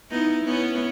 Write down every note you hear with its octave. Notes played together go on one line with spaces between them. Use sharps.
B3 D#4 E4
B3 C#4 E4